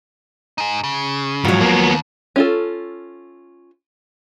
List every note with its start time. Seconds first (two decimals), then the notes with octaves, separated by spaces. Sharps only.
0.58 D#4 G#4
0.84 C#3
1.45 G#2 F3 F#3 F#4
1.61 D#2 A#3 B3
2.36 C#4 F4 A4